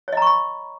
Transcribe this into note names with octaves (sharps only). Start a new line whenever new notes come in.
C#5 D#5 A#5 B5 C#6